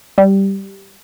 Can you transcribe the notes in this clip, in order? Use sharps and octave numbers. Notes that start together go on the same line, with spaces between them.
G3